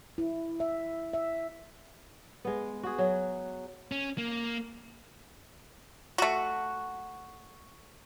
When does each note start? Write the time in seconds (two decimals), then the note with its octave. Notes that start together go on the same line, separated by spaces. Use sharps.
0.18 E4
0.60 E5
1.13 E5
2.45 G#3 B3
2.83 F#4 G#4
2.98 F#3
3.92 C#4
4.18 A#3
6.18 A3 F#4